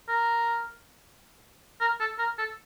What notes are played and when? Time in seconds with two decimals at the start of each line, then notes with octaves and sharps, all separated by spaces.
0.08 A#4
1.80 A#4
2.00 A4
2.19 A#4
2.38 A4